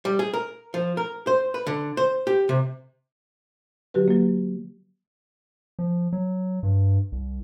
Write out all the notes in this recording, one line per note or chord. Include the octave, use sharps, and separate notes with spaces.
G3
G#4
A#4
F3
A#4
C5
B4
D3
C5
G4
C3
D3 F#3 F#4 G4 B4
F#3 A#3
F3
F#3
G2
C2